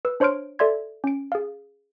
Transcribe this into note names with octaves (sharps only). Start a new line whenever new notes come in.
B4 E6
D4 C5 C#5 C6 F6 D7
A4 D5 E5 C6 G#6
C#4 D7
G#4 F5